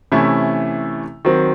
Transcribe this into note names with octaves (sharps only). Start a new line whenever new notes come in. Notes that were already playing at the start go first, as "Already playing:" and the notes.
C3 E3 A3 C#4 E4
D#3 F#3 C4